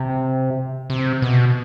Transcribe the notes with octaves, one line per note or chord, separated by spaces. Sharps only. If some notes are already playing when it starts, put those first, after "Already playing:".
Already playing: C3
C3
B2